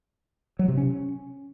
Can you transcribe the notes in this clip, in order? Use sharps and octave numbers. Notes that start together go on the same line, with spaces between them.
F#3
C3
C#4